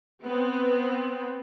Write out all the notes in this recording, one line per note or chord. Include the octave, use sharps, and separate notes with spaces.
B3 C4